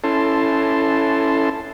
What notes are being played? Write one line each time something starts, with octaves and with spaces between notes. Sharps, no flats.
C#4 E4 A4 A5 C6